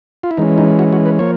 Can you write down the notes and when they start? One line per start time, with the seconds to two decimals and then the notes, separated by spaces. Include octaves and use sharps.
0.23 F4
0.31 E4
0.37 E3 G#3 C#4 D#4
0.58 D#4
0.79 F#4
0.93 F#4
1.06 B4
1.19 F3 A#3 C#5